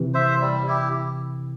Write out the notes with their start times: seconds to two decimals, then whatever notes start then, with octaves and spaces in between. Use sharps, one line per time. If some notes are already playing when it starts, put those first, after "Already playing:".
Already playing: C3 E3
0.14 C5 E5
0.41 G3
0.67 E4 G4